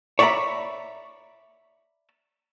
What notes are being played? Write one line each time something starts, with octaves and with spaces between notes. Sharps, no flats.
C#5 D5 E5 F#5 A#5 B5